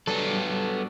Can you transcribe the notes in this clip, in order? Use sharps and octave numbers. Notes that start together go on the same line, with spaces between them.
F#3 G3 B3 D4 A4